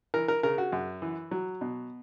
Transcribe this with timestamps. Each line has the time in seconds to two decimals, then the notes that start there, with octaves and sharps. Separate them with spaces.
0.14 E3 A#4
0.28 A#4
0.43 C#3 A#4
0.58 F#4
0.72 F#2
1.02 E3
1.31 F#3
1.61 B2